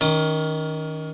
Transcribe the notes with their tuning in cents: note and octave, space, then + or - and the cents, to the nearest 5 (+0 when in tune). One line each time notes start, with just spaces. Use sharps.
D#3 +10 C#4 +35 D#6 -40